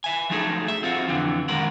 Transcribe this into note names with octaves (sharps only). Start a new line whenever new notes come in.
E5 G#5
F3 F#3 A3 D#4 G#4 A4
E5
C4 F4 F#4
F2 D3 E3
F#2 D#3 G#3 A#4 F#5